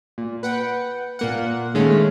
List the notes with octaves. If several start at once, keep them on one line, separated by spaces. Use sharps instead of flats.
A#2
B4 F#5 G5
A#2 A#3 F#5
D#3 G#3 A3 C#4